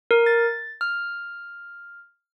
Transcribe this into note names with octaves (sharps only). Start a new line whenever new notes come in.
A#4
A6
F6